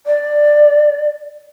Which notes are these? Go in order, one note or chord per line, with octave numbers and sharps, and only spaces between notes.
D5